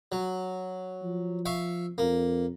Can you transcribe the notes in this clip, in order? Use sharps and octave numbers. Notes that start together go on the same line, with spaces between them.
F#3
F3
E5 F5 C#6
F2 A#3